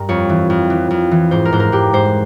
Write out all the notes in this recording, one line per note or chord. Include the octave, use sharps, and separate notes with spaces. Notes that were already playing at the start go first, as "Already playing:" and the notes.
Already playing: G2 A#4
F2 C#5
E3
F2
E3
F2
E3
G#2 C5
A#4
G#2 C5
A#4
G#2 G4
G#2 C5